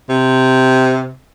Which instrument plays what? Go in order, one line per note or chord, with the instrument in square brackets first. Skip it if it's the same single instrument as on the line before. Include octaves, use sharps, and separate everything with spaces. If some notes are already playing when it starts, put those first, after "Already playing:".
[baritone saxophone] C3